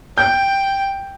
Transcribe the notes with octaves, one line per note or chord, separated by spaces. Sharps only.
G5 G6